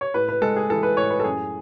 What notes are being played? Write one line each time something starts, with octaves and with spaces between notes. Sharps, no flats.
C#5
A2 B4
B4
G#3 A4
G#4
E3 A4
B4
A2 C#5
B4
A4
F#2 G#4